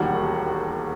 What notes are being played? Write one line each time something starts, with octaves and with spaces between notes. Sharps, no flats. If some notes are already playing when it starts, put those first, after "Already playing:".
Already playing: E1 D#2 D#3 G3 F#4 F#5